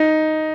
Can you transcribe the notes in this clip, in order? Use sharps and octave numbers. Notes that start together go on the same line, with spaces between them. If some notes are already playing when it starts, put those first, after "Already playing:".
Already playing: D#4